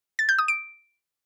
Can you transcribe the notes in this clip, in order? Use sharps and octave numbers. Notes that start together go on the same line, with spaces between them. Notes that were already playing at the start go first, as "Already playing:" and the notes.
A6
G6
D#6
D7